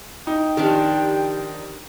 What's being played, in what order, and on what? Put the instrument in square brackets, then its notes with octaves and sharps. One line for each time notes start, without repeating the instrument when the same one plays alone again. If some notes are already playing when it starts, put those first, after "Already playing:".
[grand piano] D#4 [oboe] G5
[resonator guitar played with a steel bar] D#3 F3 D4 [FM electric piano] G4